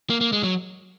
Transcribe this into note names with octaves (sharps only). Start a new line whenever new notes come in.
A#3
A#3
G#3
F#3